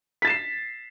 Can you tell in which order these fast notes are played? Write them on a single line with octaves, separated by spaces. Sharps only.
B6 A6 E7 C7